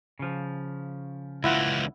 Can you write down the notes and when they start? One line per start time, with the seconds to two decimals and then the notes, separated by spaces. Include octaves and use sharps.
0.19 C#3 F3
1.44 C#2 E3 E4 F4 F#5